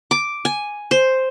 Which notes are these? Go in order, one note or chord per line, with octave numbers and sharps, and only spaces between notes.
D6
G#5
C5